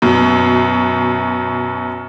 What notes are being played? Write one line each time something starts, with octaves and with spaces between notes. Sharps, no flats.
F#2 B2